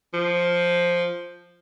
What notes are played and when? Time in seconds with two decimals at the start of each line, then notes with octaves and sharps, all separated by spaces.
0.14 F3